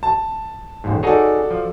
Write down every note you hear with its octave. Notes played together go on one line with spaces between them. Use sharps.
A5
A1 D#2 G#2
D#4 F#4 G#4 A4 C#5 D5
F3